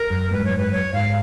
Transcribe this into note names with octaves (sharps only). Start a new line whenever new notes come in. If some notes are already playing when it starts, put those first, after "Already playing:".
Already playing: A#4
F#2
G#2 B4
F#2
C#5
G#2
B4
F#2 C#5
G#2 F5